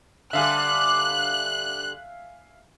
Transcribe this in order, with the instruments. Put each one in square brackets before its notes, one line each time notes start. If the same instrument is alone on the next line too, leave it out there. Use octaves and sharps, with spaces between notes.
[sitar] D3 G3 [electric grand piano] E5 F5 G#5 [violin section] F#6